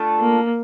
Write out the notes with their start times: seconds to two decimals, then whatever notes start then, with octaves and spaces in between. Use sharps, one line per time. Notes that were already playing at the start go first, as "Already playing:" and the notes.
Already playing: A3 D4 F4 A4
0.19 A#3